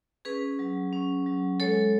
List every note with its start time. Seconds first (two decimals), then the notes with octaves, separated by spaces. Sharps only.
0.25 C#4 G#4 B4
0.59 F#3
0.93 C#4
1.26 F#3
1.60 G#3 A4 C#5